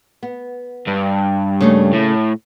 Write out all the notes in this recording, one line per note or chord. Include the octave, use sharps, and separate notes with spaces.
B3
G2
C#3 A3 A#3
A2